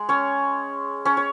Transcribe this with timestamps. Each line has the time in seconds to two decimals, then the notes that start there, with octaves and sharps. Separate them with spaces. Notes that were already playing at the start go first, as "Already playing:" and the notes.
Already playing: G#3 G#4
0.09 C#4 C#5
1.05 C#4 C#5
1.17 C#5